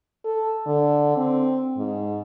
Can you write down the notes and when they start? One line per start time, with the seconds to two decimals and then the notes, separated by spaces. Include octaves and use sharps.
0.25 A4
0.66 D3
1.16 C4
1.77 G#2